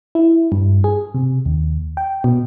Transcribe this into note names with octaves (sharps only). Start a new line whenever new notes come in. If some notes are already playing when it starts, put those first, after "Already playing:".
E4
G2
G#4
C3
D#2
G5
B2